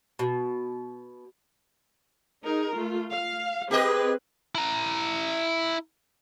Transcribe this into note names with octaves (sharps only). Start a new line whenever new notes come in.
B2
D#4 G#4 A#4
A3 F4
F5
C4 G4 G#4 B4 D#5
E4 A#5